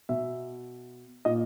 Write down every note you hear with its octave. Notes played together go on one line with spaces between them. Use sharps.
B2 E5
A#2 D#5